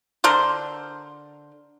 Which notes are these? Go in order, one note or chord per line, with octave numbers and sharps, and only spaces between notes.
D3 A#4 C5